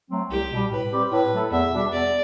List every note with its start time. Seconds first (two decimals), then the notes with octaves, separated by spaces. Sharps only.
0.11 F#3 A3 C4
0.30 C2 G4
0.51 B2 G3
0.71 A2 B4
0.92 G3 C4 G4
1.12 A2 B4
1.32 F#3 A3 E4 A4
1.52 E2 E5
1.73 B2 G3 D4
1.92 E2 D5